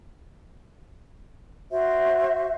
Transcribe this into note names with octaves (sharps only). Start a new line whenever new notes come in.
F#4 C5 E5